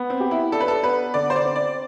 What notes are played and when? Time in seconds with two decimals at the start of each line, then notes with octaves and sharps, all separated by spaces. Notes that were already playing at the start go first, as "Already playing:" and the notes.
Already playing: B3
0.10 C4
0.20 G4
0.31 E4
0.52 D4 A4
0.61 B4
0.68 A4
0.83 B3 B4
1.14 D3 D5
1.30 C5
1.36 D5
1.46 C4
1.56 D5